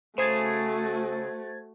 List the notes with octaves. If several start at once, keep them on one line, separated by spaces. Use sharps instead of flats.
C#3 A3 F#4 G#4 C5 G#6 A6